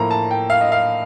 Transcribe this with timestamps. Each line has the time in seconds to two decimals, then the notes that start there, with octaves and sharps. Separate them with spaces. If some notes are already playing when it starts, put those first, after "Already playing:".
Already playing: A2 F3 A#3 A#5
0.11 A5
0.31 G5
0.50 F5
0.61 D#5
0.72 F5